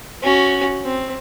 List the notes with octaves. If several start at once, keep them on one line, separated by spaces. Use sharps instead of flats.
C#4 F#4
C4